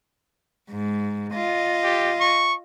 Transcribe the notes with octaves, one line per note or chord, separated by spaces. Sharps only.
G#2
F4 D#5
G4
C#6